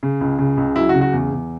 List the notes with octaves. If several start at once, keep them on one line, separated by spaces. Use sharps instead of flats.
C#3
C#2
C#3
C#2
F#3 E4
F#4
C#3
F#4
E2
E2